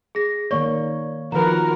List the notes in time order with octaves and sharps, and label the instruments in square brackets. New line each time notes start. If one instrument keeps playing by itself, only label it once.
[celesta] G#4 A#6
[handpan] D#3 A#3 C#5 [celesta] D5 C#6
[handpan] D#3 F3 B4 [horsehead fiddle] F#4 A#4 [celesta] A#5